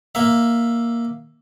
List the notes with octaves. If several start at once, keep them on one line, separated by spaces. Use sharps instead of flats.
A#3 E5